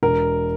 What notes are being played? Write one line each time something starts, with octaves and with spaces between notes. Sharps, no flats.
E1 A#4